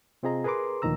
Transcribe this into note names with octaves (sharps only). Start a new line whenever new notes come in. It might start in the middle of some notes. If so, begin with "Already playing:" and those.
C3 C4 F4 G#4 D#5 A#5
G#4 A#4 B4 A#5 C6 D6
D2 A#2 D#3 F3 A#5 E6